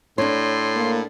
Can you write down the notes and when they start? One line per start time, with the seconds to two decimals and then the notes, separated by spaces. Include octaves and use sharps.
0.18 A2 D4 C#5 C6
0.76 A#3